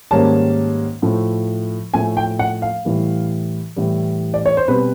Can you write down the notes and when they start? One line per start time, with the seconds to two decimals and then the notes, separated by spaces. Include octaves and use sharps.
0.11 G#2 D#3 G3 A#3 C#4 A5
1.02 A2 F3 A3
1.94 A2 F3 A3 G#5
2.17 G5
2.39 F#5
2.62 F5
2.85 A2 E3 G3
3.76 A2 E3 G3
4.34 D5
4.46 C#5
4.57 C5
4.68 B2 G3 C4 B4